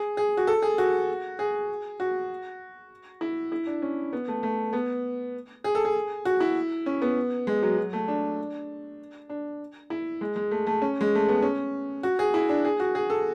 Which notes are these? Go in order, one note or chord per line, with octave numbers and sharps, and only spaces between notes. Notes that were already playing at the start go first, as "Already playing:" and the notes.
Already playing: G#4
G#4
F#4
A4
G#4
F#4
G#4
F#4
E4
E4
D4
C#4
B3
A3
A3
B3
G#4
A4
G#4
F#4
E4
C#4
B3
G#3
F#3
F#3
A3
D4
D4
E4
G#3
G#3
A3
A3
C#4
G#3
A3
B3
C#4
F#4
G#4
E4
D4
G#4
F#4
G#4
A4